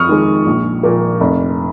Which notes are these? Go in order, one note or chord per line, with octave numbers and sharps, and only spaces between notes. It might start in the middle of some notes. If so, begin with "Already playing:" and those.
Already playing: F2 C#6 D#6 F6
D#3 G#3
A#1
A#2 F3 A#3
F1